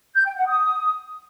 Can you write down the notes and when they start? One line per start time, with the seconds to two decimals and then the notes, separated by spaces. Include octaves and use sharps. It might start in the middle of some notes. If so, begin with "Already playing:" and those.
0.14 G6
0.25 G5
0.36 F#5
0.47 D#6